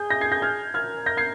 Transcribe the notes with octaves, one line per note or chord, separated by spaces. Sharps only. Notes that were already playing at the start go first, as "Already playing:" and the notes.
Already playing: G#4 G6
G6 A#6
G#6 C7
G6 A#6
F6 G#6
A#4 F6 G#6
G6 A#6
G#6 C7